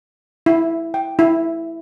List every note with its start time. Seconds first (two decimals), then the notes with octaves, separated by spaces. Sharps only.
0.46 E4
0.94 G5
1.19 E4